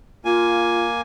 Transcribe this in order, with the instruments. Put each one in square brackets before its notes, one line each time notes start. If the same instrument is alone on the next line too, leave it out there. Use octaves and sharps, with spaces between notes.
[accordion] A#3 G#5 [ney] F4